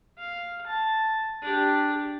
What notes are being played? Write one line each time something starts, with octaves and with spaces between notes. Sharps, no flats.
F5
A5
D4 G4